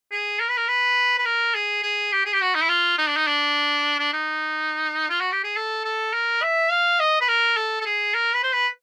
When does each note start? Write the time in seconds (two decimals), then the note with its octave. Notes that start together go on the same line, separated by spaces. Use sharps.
0.12 G#4
0.40 A#4
0.48 B4
0.57 A#4
0.68 B4
1.18 B4
1.25 A#4
1.54 G#4
1.83 G#4
2.12 G4
2.26 G#4
2.33 G4
2.41 F#4
2.55 D#4
2.62 E4
2.69 F4
2.98 D#4
3.08 D4
3.16 D#4
3.27 D4
3.99 D4
4.13 D#4
5.09 F4
5.20 F#4
5.32 G4
5.44 G#4
5.57 A4
5.84 A4
6.13 A#4
6.43 E5
6.71 F5
7.00 D#5
7.21 B4
7.28 A#4
7.57 A4
7.81 A4
7.86 G#4
8.14 A#4
8.33 B4
8.43 C5
8.53 B4